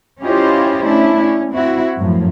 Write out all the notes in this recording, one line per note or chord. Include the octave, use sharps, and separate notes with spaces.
C#4 E4 F4 G4 C5 D#5
A3 C#4 D4 E4
C#4
C4 E4 F#4
F#2 A2 F3